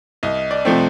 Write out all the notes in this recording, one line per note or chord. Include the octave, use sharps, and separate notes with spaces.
C2 D#5
D5
C3 F3 A3 C4